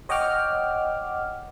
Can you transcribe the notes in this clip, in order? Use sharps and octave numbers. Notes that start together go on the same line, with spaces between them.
C#5 D#5 F#5 G5 D6 F6